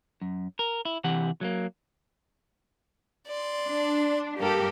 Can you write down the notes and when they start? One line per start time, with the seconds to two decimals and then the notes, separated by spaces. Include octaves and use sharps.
0.21 F#2
0.59 A#4
0.85 E4
1.04 C3 E3 G4 F#5
1.41 F#3 A3 A#3
3.27 D5 C6
3.65 D4
4.38 G2 A#3 G4 A4 A#4